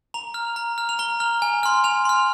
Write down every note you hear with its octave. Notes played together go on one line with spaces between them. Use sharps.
A#5 F7
F6
A#5
F6
F7
A#5 G7
F6
G#5
C6 F6
G#5 F7
C6 F6